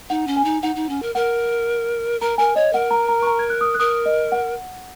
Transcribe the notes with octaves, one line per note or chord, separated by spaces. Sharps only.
D#4 F#5
C#4
G#5
D#4
D#4 F#5
D#4
C#4
A#4
A#4 F#5
A#4 A#5
A#4 G#5
C#5 D#5
A#4 F#5
A#5
A#5
C#6
A#5
G#6
F#6
D#6
F#6
A#4 D#6
D#5
F#5